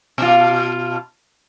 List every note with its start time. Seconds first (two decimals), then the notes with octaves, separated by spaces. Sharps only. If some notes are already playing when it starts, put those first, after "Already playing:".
0.18 B2 F4